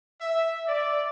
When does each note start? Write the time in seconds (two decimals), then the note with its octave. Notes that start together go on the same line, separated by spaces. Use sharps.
0.21 E5
0.67 D5